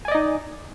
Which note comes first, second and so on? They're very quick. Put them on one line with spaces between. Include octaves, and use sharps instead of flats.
G#5 D5 D#5 D#4